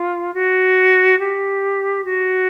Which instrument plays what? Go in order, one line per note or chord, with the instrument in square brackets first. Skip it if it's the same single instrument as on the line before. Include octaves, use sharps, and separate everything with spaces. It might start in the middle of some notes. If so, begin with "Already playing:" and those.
Already playing: [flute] F4
F#4
G4
F#4